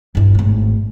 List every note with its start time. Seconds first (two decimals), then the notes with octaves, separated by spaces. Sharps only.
0.15 G2 E4
0.35 G#1 A2